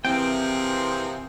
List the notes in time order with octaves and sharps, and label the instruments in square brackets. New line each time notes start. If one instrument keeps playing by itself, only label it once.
[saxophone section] C3 E3 [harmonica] F3 A#3 G#4 [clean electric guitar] C4 [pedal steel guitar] G5